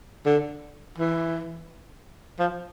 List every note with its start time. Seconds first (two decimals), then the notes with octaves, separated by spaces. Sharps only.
0.26 D3
0.98 E3
2.39 F3